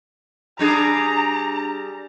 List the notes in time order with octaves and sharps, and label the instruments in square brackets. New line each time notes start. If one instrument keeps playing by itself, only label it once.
[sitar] G3 D4 G#4 [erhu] A#5